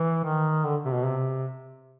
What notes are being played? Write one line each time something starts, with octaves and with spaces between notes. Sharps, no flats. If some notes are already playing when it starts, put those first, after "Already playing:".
Already playing: E3
D#3
D3
C3
B2
C3